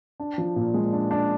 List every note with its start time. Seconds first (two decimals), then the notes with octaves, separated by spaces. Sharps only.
0.20 D4
0.38 F3
0.56 A#2
0.74 G#3
0.93 D4
1.11 D4